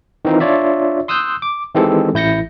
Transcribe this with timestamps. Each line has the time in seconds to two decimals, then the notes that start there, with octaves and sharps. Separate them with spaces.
0.25 D#3 E3 C4 D#4 F4
0.40 D4 F4 C#5 D5 E5
1.08 C6 D#6 E6 F#6 G6
1.42 D6
1.75 D#3 E3 G#3 C4 G4 A4
2.14 A1 E4 G6 A#6 C#7